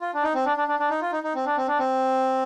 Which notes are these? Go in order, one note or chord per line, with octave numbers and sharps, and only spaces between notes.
F4
D4
D#4
C4
D4
D4
D4
D4
D#4
F4
D#4
D#4
C4
D4
C4
D4
C4